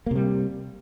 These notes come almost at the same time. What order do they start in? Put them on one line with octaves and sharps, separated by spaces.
A#3 C3 G3